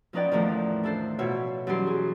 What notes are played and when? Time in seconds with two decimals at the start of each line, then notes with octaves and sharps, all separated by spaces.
0.13 F3 C#4 D#4 B4 D5 G5
0.32 E2 A2 D#3 F3
0.83 D4 E4 A4 C5
1.19 B2 F4 C#5 E5
1.67 F#2 E3 G3 D#4 G4 C6
1.87 G#4